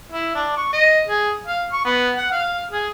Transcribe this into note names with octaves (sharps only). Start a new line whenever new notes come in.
E4
D4
C#6
D#5
G#4
F5
C#6
B3
F#5
F5
G#4